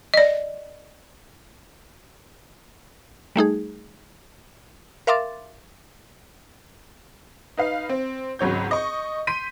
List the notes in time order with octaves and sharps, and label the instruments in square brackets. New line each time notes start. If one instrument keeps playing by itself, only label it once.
[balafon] D5 D#5
[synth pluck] G3 A3 D#4 G#4
A#4 E5 F5 C6 D6 A6
[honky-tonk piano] D#4 B4 F5
C4
G#1 C#2 F#3 C#5 G6
D#5 C#6
C6 G6 B6 D#7